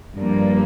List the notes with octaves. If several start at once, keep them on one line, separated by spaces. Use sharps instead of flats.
G2 F3 A#3